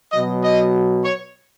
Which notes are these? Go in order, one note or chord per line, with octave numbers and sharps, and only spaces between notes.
B2 F#3 D#5
D#5
C#5